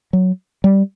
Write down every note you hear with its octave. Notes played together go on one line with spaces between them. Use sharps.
F#3
G3